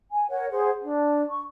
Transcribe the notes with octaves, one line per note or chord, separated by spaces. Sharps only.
G#5
A#4 C#5 F#5
G#4 C5 F#5
D4
C#6